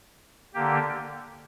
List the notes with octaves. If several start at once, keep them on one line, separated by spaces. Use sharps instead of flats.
D3 A#3 G4